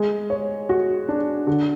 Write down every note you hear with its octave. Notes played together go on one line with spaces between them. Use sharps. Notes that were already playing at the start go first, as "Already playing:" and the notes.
Already playing: G#3
C#5
F#4
D4
D3